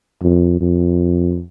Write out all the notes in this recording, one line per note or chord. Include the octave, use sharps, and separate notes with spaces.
F2
F2